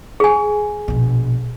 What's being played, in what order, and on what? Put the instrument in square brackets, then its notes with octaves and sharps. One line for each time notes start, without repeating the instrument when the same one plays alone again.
[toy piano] G#4 G#5
[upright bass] A#1 B2